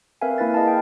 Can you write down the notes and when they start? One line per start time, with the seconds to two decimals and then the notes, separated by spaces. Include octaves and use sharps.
0.21 C4 A#4 B4 E5 F5 G#5
0.38 A#3 E4 B4 A6
0.54 G#4 D#5 F5 G#5 A5
0.68 G5